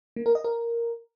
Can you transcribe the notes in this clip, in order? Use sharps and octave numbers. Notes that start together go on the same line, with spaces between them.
A#3
A#4
D#5
A#4